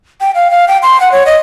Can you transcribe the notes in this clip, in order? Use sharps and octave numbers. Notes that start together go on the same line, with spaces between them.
G5
F5
F5
G5
C6
F#5
C#5
D#5